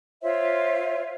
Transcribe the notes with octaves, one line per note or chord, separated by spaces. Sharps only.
F4 C5 C#5 E5